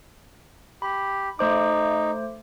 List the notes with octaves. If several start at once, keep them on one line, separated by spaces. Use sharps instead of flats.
G4 B5
A3 D#4 C5 D6